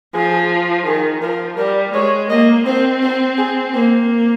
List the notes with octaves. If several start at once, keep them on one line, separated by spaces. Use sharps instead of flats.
F3 G#4
D#3 G#4
F3 A#4
G3 A#4
G#3 C#5
A#3 D#5
C4 C5
C5
G#4
A#3 C5